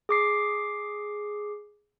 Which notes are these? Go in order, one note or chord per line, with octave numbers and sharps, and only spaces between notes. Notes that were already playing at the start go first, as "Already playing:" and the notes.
G#4 D6 C7